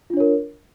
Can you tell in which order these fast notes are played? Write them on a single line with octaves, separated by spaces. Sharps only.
F4 D4 C#5 A#4